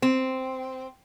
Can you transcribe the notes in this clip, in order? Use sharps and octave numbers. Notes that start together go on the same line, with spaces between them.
C4